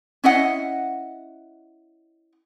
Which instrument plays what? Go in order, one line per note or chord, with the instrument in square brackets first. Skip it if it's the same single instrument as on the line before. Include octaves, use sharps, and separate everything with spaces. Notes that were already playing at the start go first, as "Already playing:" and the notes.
[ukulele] C#4 E4 D#5 F#5